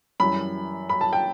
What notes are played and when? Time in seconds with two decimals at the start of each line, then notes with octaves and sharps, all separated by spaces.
0.20 F#2 E3 G3 B5
0.89 B5
1.01 A5
1.13 G5